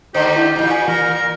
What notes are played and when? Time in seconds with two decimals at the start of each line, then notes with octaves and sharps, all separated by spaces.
0.14 D3 D#3 A3 G4 C5
0.36 E4
0.56 E2 A#2 G6
0.71 G#5
0.88 E3 A#4
1.14 A#4